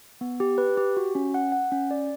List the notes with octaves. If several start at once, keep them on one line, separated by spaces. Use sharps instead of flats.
B3
G4
B4
G4
F#4
C#4
F#5
F#5
C#4
D5